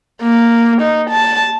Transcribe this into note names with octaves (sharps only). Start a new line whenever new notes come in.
A#3
D#4
A5